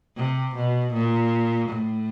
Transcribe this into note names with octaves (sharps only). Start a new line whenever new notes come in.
C3
B2
A#2
A2